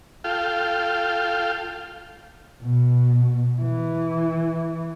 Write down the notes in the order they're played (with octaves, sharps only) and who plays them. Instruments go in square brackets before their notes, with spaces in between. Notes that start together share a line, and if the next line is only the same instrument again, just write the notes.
[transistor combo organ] F4 A4 F5 G5
[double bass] B2
E3